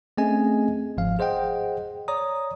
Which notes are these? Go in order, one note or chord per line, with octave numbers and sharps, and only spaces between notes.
A3 C4 C#4 G#4 D#5 G#5
G1 G#2 F3 F5
G#4 C5 D#5 F#5 G5
C#5 D5 A#5 D#6